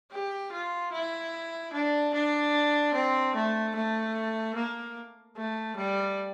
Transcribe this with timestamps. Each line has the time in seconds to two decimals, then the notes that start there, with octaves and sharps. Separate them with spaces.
0.12 G4
0.52 F4
0.92 E4
1.73 D4
2.14 D4
2.94 C4
3.35 A3
3.75 A3
4.56 A#3
5.37 A3
5.77 G3